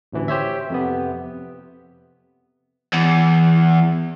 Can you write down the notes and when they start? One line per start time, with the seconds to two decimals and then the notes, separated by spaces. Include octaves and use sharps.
0.13 A1 D2 E3
0.28 G4 C5 C#5 E5
0.70 F2 C3 B3
2.94 E2